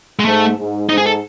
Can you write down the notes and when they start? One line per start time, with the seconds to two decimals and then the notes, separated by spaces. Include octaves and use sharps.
0.19 G#3
0.25 G#2 A3
0.58 G#2
0.89 G#2 D#4
0.98 G#4
1.06 A4